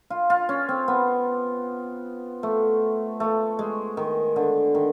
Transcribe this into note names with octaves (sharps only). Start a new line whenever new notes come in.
F4
F4
C#4
C4
B3
A3
A3
G#3
D#3
D3
D#3